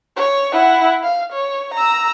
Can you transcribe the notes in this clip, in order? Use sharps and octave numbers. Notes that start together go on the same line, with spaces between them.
C#5
E4 F#5
F5
C#5
A#5 E6